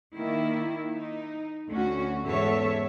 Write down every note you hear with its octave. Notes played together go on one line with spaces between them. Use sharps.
D#3 A#3 E4
D#4
D2 C#4 F#4
E2 G#2 A4 C#5 E5